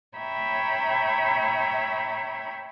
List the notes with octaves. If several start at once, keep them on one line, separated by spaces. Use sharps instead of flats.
C#5 E5 G5 A#5 B5